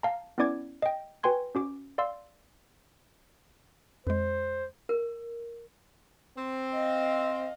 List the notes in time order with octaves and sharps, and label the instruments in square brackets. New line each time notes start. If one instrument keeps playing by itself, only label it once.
[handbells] F5 A5 A#5
B3 C#4 E4 D5 D6 G#6
D#5 G5
F#4 B4 G5 G#5 C6 G#6
C#4 F#4 D6
D5 F5 C6 E6
[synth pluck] F2 G#3 [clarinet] C5
[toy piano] A#4
[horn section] C4
[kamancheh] D#5 F5